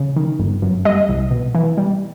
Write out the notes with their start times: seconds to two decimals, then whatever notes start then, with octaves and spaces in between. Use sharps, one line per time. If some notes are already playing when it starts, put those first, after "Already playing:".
Already playing: C#3
0.16 D#3
0.39 G1
0.62 F#2
0.85 G3 D#5
1.09 C2
1.31 B2
1.55 E3
1.77 G3